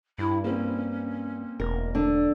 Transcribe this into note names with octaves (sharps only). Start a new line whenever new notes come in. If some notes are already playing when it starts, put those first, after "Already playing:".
G2 E4
A#3 C4 C#4
E1 A#4
D3 D4